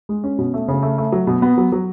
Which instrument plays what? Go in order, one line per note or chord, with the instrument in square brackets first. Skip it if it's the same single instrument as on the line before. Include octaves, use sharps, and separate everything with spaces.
[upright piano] G#3
C#4
B2
A3
C#3
A3
A3
F#3
B2
B3
F#3
F#3